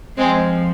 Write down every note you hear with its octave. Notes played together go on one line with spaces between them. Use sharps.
F2 F3 G#3 C4